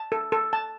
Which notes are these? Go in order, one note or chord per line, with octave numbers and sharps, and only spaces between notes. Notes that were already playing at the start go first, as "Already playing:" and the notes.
Already playing: A5
A4
A4
A5